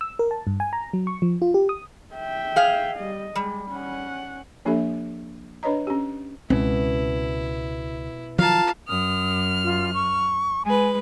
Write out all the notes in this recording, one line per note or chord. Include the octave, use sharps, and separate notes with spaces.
E6
A#4
A5
G2
G#5
A#5
F#3
C#6
F3
F4
G4
D#6
E5 G5
G#4 F5
G3 D#5
G3 G#3
C#4 F#5
F3 A#3 D4 G4 A4 E5
D4 B4 C#5 D#5 A#5
C#4 G4
C#2 B2 C4 C#4 E4
D#3 F3 F#3 F4 A4 F5 A5 A#5
F#2 D#6 F6
F4
C#6
G#3 B4 G#5